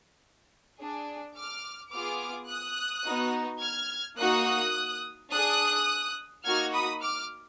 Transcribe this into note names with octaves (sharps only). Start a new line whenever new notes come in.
D4 G#4
D6 F6
B3 F4 G#4 D6 F6
D#6 F#6
B3 D#4 F#4
F6 G#6
A#3 D#4 F#4 D#6 F#6
D4 G#4 D#6 F#6
A#3 D#4 F#4 F6 G#6
B5 D#6
D6 F6